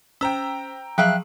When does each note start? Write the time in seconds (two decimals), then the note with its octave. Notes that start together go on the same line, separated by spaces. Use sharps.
0.21 C#4 C5 G5 A#5 E6
0.98 F3 F#3 G#4 E5 F5 G5 F#6